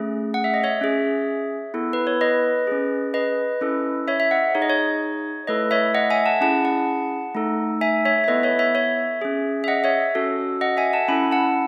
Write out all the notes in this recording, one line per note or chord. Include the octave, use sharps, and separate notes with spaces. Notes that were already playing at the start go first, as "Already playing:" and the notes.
Already playing: A3 C#4 G#4
F#5
E5
D#5
C#5 E5
C#4 G#4
B3 E4 A4
B4
C#5
B4 D#5
C#4 G#4
B4 D#5
C#4 E4 A4
C#5 E5
E5
D#5 F#5
D#4 G#4 C#5
D#5
C#5
A3 E4 A4 B4 D#5
C#5 E5
D#5 F#5
E5 G#5
F#5 A5
C#4 E4 G#4 F#5 A5
F#5 A5
A3 D#4 A4
E5 G#5
C#5 E5
E5
B3 E4 A4 B4 D#5
C#5 E5
C#5 E5
C#5 E5
C#4 G#4
E5
D#5 F#5
C#5 E5
C#4 F#4 A4
D#5 F#5
E5 G#5
F#5 A5
C#4 E4 A4 G#5 B5
F#5 A5